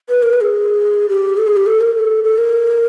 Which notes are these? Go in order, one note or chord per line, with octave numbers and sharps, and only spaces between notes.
B4
A#4
B4
G#4
G4
A4
G#4
G4
A4
A#4
A4
A4
A#4